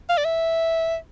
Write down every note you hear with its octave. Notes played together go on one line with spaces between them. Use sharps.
F5
D5
E5